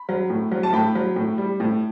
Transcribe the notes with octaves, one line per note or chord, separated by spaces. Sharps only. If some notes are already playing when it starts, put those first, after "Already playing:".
Already playing: B5
F#3
A2
F#3
A5
A2 G5 B5
F#3
A2
G3
A2